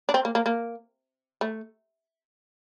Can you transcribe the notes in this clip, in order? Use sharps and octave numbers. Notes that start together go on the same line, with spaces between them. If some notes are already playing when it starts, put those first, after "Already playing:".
D4
C4
A#3
A#3
A#3
A3